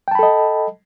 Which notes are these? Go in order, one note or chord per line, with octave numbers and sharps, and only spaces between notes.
A4 D#5 G5 A5 B5